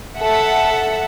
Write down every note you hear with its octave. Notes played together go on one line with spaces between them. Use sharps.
A4 E5 F#5